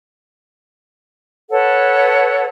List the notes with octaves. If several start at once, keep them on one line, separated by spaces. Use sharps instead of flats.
A4 B4 C#5 F#5